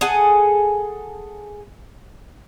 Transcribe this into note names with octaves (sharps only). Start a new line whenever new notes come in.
G#4 A4 F#5 G#5